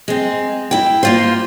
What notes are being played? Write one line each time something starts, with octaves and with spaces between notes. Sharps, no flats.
G#3 C4
E4 G5
A#3 F4 C5